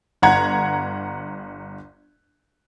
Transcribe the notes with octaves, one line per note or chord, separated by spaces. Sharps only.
G1 F#5 A#5 G#6